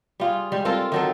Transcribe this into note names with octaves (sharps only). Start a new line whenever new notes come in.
G3 F4 G#4
G3 G#3
C4 F4 A4 A#4
D#3 F#3 A4